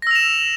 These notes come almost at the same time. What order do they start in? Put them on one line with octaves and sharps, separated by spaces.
A#6 E6 F7 E7